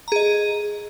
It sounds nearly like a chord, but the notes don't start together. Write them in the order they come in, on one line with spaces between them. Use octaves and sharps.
A#5 G#4 D#5